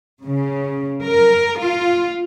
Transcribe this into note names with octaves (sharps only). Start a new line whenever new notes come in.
C#3
A#4
F4